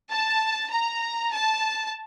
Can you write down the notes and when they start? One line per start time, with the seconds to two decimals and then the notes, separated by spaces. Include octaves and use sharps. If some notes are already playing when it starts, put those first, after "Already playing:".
0.11 A5
0.72 A#5
1.33 A5